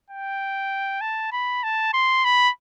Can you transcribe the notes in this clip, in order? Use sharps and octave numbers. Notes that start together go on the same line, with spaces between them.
G5
A5
B5
A5
C6
B5